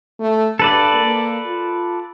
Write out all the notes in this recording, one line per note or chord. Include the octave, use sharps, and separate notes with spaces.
A3
G2 A4 B4 D5
A#3
F4